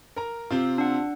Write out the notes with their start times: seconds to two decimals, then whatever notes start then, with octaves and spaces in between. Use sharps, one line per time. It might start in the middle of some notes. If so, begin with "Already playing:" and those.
0.16 A#4 A#5
0.51 C3 C4 F4
0.78 D4 F#5